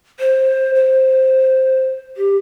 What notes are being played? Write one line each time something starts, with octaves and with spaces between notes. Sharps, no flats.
C5
C5
G4